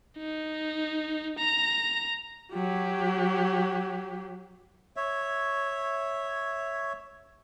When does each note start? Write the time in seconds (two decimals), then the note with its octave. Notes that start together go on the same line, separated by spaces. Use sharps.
0.18 D#4
1.39 A#5
2.53 F#3 G4
4.96 C#5 E5